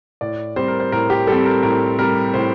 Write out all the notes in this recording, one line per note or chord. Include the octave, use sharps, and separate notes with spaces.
A2 D5
G3 C4 C5
A#4
C5
A2 A#4
G4
G3 C4 A4
A#4
A2 A#4
G3 C4 A#4
A2 C5